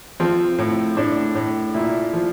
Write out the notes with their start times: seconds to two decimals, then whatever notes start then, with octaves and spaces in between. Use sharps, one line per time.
0.20 F3 C4
0.58 A2
0.97 A2 D4
1.35 A2
1.74 A#2 E4
2.13 F3